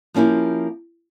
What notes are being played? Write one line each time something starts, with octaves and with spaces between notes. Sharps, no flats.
F3 A#3 C#4 E4 G4